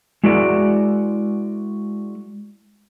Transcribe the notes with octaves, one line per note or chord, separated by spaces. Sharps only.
G#3 E4 F#4 A#4 D5